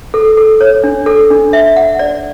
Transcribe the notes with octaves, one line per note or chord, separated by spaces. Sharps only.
A4
A4
C#5
D4
A4
D4
E5
F#5
D5